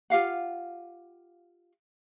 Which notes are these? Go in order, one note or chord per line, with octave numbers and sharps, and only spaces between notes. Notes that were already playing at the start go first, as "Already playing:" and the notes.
F4 G4 F5 F#5